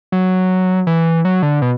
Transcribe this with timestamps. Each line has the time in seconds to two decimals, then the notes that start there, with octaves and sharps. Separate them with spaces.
0.12 F#3
0.87 E3
1.25 F#3
1.43 D3
1.62 B2